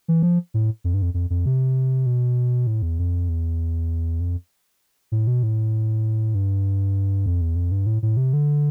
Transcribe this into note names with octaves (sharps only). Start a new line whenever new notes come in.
E3
F3
A2
F2
G2
F2
F2
F2
C3
B2
A2
E2
F2
E2
F2
A2
B2
A2
G2
F2
E2
F2
G2
A2
A2
C3
D3